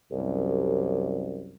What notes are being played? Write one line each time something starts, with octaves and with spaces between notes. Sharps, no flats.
C2 F#2